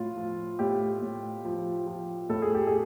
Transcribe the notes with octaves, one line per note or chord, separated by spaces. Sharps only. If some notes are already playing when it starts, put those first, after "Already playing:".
Already playing: A2 F4
F3
A2 G4
A2
F3
F3
A2 A4
G#4
G4
G#4